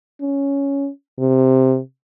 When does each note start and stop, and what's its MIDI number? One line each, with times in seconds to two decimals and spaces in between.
0.21 0.89 61
1.19 1.79 48